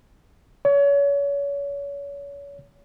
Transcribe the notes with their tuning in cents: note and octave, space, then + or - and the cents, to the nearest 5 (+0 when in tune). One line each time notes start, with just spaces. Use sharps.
C#5 +30